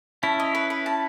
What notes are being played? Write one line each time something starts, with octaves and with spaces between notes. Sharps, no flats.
C#4 E4 A5
D#5
B4
B4
A5